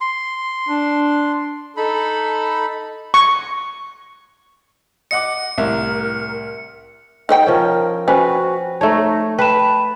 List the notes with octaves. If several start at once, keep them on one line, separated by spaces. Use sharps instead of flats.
C6
D4
D#4 A4 B5
C#6
D#5 F#5 D6 C#7
C2 A2 A#4
D#4 C5 F#5 G5
F3 C#4 A#4
C#4 F#4 B4 C5 G5 G#5
A3 D#4 C#5 A5
B4 G5 A5 B5 E7